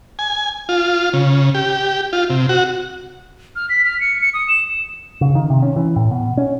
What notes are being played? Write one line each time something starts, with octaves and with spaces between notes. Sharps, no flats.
G#5
F4
C#3
G4
F4
C3
F#4
F6
B6
F6
C#7
C#7
D#6
E7
C#3
D#3
C3
C#4
E3
A2
B2
C#4